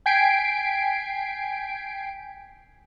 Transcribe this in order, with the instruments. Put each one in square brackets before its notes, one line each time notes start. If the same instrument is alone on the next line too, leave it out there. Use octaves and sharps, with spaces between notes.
[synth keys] G5 G#5 G#6 B6 C7 D7